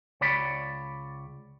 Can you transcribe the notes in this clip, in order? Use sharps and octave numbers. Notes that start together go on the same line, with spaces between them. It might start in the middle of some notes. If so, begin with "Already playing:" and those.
C#2 C#5 D5 B5